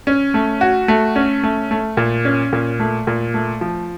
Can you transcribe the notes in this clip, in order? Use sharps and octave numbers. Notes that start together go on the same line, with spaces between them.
C#4
A3
F#4
A3
C#4
A3
A3
A#2
C#4
A#2
A3
A#2
A3
F3